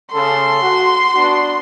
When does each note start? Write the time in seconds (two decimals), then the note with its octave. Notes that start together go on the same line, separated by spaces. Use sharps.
0.13 C#3 A4 C6
0.62 F#4
1.15 B3 D4 F#4